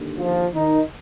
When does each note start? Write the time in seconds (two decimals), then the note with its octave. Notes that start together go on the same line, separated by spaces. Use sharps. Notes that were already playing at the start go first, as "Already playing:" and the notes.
Already playing: D#2 D3
0.18 F3 F4
0.54 D#3 D#4